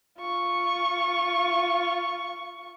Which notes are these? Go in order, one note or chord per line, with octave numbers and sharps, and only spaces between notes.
F4 C#6